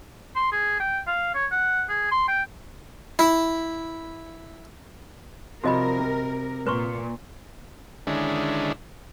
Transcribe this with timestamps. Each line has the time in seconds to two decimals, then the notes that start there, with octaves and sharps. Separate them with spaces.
0.36 C6
0.52 G#4
0.80 G5
1.07 F5
1.35 C#5
1.51 F#5
1.89 G#4
2.11 C6
2.28 G5
3.19 E4
5.64 C2 C3 F3 F#4 A#4 D#5 B5
5.99 C3
6.67 A#2 B4 C6 C#6
8.07 D3 D#3 G#3 C#4 D4 E4